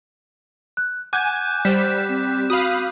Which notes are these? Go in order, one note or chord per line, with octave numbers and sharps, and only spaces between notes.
F#6
F#5 G#5 D6 F#6 G6
G3 C5 B6 E7
C4
F#4 F5 B5 D#6